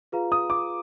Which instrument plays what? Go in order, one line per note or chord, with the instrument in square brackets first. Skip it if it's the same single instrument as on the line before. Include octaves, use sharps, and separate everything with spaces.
[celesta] F4 G#4 B4 F5 A#5
[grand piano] D#6
D6